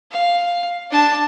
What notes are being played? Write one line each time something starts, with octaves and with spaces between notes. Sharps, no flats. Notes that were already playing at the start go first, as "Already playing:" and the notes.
F5
D4 A5